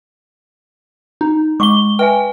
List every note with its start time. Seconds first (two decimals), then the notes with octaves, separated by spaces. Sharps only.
1.21 D#4
1.60 G#3 F#5 C#6 D6 G7
1.99 B4 E5 G5 G#5